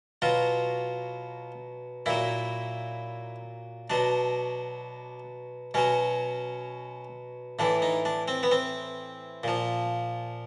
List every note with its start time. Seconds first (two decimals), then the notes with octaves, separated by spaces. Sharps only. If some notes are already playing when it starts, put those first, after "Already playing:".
0.22 B2 F#3 F4
2.06 A#2 F#3 E4
3.90 B2 F#3 D4
5.74 B2 F#3 C#4
7.59 A2 E3 D4
7.82 D#4
8.05 D4
8.28 C4
8.43 B3
8.51 C4
9.44 A#2 F3